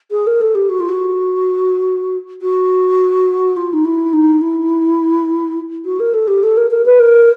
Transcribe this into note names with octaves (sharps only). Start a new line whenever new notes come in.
G#4
A#4
A4
G4
F#4
F4
F#4
F#4
F4
D#4
E4
D#4
E4
F#4
A#4
A4
G4
A4
A#4
A#4
B4
A#4